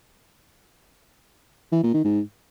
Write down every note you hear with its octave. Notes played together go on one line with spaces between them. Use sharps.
E3
A#2
D#3
G#2